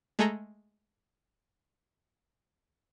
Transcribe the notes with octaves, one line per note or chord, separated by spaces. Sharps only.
G#3 A3 G#4 A4 A#5 A#6